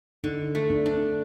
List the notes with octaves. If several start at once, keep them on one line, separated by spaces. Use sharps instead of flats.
D3 D#4
A3
D4
D4